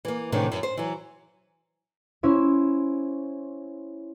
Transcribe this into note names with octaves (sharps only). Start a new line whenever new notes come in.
E3 A#3
A2 C3 D#3 E3 D4
F#2
C5
E3 F#3
C#4 E4 C5